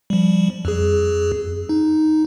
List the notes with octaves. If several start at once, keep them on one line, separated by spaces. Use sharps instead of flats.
F3 G3
F2 G#4
D#4